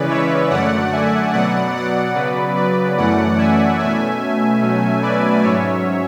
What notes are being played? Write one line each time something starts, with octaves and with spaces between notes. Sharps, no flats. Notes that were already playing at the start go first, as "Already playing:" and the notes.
Already playing: C#3 E3 G#3 C#4 B4 D5
C#5 E5
F#2 D3 A3 D5 F#5
E5 G#5
B2 F#3 B3 D5 F#5
D5 F#5
C#3 F#3 B3 B4 D5
B4 D5
F#2 E3 A3 C#4 D5 F#5
E5 G#5
B2 A3 C#4 E5 G#5
B2 F#3 A3 C#4
B4 D5
G#2 F#3 C#4 C#5 E5